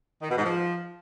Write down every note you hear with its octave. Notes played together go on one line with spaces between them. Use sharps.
D#3
B2
G#2
F3